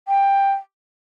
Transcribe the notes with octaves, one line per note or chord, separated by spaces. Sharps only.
G5